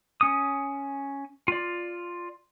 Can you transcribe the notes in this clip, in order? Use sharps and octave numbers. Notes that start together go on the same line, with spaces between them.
C#4 D#6
F4 D5